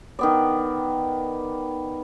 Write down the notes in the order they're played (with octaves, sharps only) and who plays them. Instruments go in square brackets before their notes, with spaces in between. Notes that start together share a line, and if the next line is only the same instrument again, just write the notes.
[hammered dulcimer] D#3 B3 D5